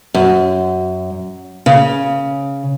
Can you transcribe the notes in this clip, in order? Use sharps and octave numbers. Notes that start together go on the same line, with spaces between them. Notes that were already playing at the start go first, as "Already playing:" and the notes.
F#2
C#3